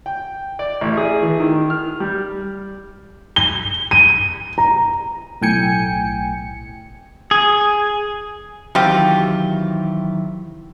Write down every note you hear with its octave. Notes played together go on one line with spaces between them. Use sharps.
G5
D5
A1
G#4
E3
D#3
F6
G3
G7
D#7
A#5
B1 A2 G5 G#5 C#7
G#4
C3 D#3 E3 F#3 F4 G4